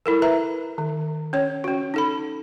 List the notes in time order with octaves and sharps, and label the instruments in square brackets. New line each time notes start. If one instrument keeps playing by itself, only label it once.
[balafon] E4 A4 A#4
B4 E5 A#5
D#3
C#4 C#5
C#4 F#4
D#4 A4 B5